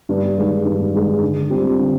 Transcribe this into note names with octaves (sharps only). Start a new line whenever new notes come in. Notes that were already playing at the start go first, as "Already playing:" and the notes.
G2
D#3 G#3
G2
D#3 G#3
D3
G3 C4 F4
D3